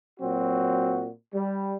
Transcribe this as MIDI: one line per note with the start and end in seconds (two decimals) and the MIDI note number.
0.20 1.08 46
0.20 1.08 54
0.20 1.08 60
0.20 1.08 66
1.34 1.76 55